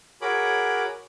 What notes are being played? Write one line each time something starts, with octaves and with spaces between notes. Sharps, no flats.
F#4 G#4 A#4 C#5 B5 D6